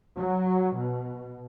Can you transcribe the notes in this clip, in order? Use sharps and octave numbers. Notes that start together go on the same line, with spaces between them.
F#3
B2